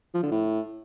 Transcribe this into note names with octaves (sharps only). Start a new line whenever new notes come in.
F3
D3
A2